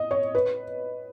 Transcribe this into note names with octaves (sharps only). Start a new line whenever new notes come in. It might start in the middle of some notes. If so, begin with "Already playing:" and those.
Already playing: D#5
C#5
B4